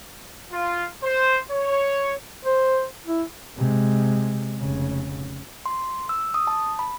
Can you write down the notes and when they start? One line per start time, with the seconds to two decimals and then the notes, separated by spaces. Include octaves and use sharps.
0.52 F4
1.03 C5
1.50 C#5
2.45 C5
3.07 E4
3.57 C3 G#3
4.59 F1 C#3
5.66 C6
6.09 E6
6.34 D#6
6.47 A5
6.79 B5